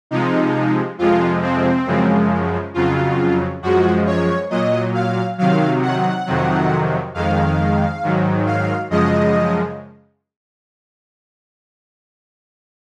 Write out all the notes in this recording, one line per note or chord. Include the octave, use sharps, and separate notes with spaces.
C3 F3 G#3 D#4
F2 C3 F3 G#3 F4
C4
F#2 C#3 F3 G#3
F2 C#3 F#3 F4
F#2 F3 G#3 F#4
C#5
A#2 F#3 D#5
F5
C3 D#3 F#3 F5
F#5
F2 C3 D#3 F#3
F2 D#3 G#3 F5
G#2 D#3 F#3
F5
F#2 C#3 F3 G#3 D#5